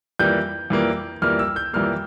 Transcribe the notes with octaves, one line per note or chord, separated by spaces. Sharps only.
F2 E3 G3 A#3 G6
F2 E3 G3 A#3
F2 E3 G3 A#3 F6
E6
G6
F2 E3 G3 A#3 F6